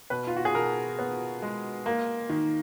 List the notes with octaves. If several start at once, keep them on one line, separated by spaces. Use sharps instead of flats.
B2 B4
F4
F#4
G#4
B2 A#4
B3
G#3
A#3
D#3